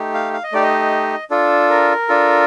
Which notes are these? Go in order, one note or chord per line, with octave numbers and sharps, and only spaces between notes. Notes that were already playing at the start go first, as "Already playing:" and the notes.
Already playing: A3 D#4 G4
F5
F5
D#5
A3 D#4 G4 D5
D#5
D4 F4 A4
A#4
D4 F4 A4